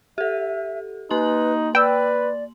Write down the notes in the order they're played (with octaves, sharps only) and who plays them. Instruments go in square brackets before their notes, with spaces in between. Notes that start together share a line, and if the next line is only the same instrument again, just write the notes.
[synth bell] G4 A4 [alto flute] E5
[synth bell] A#3 C6 F#7 [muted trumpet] D#4 [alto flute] B4
[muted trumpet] B4 [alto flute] D5 [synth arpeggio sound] G5 E6